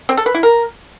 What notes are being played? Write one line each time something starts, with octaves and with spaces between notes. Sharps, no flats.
C4
A4
B4
E4
A#4